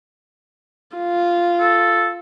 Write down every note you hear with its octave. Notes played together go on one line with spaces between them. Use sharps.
F4
A4